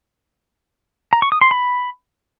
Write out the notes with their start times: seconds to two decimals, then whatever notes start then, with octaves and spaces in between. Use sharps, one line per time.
1.13 A#5
1.22 C#6
1.32 D#6
1.41 C6
1.51 B5